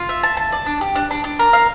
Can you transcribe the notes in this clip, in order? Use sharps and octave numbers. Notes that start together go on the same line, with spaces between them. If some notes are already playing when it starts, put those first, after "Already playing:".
Already playing: F4
E5
A5
A5
D5
D4
G4
D4
D4
D4
A#4
F5